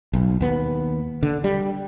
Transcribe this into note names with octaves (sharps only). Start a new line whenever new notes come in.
B1
D#2 B3
D3
G3